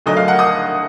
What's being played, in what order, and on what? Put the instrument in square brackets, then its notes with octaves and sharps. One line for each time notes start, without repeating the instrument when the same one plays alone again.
[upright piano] D2 D3 F#3 D4 D#5
F5
F#5
D#6